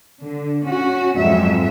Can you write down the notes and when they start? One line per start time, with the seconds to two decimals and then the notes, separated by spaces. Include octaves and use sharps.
0.22 D3
0.65 C#4 F#4
1.16 F2 G#2 F#3 G#3 E5